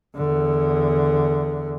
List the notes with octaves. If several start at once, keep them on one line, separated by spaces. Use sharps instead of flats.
E2 D3